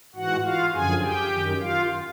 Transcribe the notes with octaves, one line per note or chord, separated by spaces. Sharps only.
G#2 E3 F#4 F#5
F4 F5
F#2 D3 F3 G#4 G#5
G4 G5
F#2 D#3
F4 F5